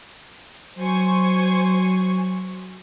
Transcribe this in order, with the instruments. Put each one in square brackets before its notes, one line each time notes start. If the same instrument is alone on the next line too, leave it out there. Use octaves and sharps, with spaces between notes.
[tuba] F#3 [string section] C5 G#5 C#6